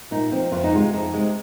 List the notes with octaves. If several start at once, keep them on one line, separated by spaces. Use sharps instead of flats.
A#2 D#4
F3 C4
F2 F4
D#4
C3 G#3 F4
F2 D#4
C3 G#3